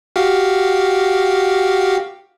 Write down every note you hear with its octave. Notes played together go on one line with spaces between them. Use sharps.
F#4 G4 F5